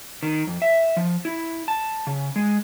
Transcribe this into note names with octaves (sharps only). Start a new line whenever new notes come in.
D#3
F2
E5
F3
E4
A5
C#3
G#3